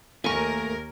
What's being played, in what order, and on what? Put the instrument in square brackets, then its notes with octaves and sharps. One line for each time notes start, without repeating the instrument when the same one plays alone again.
[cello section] D#2 A#4 [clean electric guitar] A3 [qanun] G#5 C#6